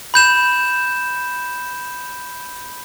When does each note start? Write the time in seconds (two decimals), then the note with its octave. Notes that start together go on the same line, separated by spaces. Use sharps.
0.14 B5 G6 E7